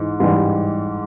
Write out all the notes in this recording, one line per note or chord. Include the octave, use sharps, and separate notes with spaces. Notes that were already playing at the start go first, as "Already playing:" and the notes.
Already playing: G#2 E3
G#2 E3 G3